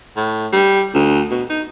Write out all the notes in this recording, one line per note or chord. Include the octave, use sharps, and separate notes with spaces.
A2
G3
D2
B2
D#4